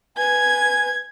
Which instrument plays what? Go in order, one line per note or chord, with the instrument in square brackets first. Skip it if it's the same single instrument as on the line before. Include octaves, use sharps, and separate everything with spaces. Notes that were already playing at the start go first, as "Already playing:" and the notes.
[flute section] B4 G#5 [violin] G#6